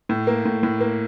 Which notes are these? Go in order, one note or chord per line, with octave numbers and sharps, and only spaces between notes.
A2
A#3
A2
A2
A#3